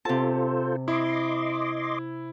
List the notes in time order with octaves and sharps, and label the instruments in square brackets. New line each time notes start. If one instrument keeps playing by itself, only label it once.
[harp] C3 A5 [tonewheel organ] F4 A4 C5
[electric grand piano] E4 [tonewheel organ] D#5 C6 D6